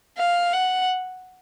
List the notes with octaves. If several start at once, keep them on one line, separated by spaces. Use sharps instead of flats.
F5
F#5